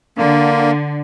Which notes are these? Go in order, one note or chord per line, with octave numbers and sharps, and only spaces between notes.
D3 A#3